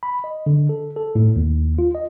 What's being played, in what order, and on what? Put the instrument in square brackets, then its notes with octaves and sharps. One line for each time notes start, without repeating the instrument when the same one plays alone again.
[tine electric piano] B5
D#5
D3
A4
A4
A2
D#2
F4
D#5